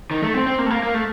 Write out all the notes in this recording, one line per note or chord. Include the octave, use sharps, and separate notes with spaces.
D#3
A3
C4
C4
A#3
A3
A#3
A#3
A3